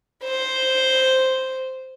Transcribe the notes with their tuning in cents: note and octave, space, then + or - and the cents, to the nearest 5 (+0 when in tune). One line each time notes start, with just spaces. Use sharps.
C5 +0